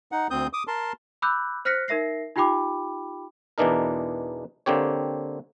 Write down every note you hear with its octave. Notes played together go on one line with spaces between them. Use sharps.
D#4 F#5
D2 C4 D#6 G6
D6 D#6
A#4 A5 C6
B5 D6 E6 F#6 G6
C5 F6 F#6 A#6 B6 C#7
D#4 A#4 E5 A#6 C7
D#4 F4 G4 G5 B5 D6
E2 B2 E3 D4 D#4 A#4
D3 A#3 C4 G4 C#5